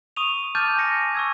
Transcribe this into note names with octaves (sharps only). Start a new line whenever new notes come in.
C#6 D#6 D#7 F7
A5 D6 F6 G6 A6 D#7
G#5 C#6 A#6 C#7
C#6 E6 G#6